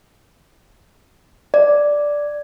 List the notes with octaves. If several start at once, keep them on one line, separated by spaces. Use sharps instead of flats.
D5